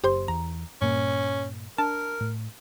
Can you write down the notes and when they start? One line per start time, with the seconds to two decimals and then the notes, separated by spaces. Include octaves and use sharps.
0.04 F#1 G4 C5 C6
0.28 E2 A#5
0.81 G2 A#2 A#3 C#4
1.78 D4 A#4 A5
2.21 A2